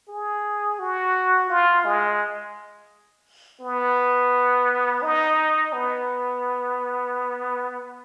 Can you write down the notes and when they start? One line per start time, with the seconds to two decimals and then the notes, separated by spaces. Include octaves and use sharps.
0.09 G#4
0.79 F#4
1.50 F4
1.85 G#3
3.61 B3
5.02 D#4
5.73 B3